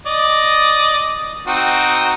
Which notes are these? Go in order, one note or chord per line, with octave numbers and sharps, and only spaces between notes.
D5 D#5
C4 D#4 F#4